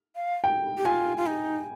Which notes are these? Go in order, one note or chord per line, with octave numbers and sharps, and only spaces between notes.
F5
G5
G4
F4 G#5
F4
D#4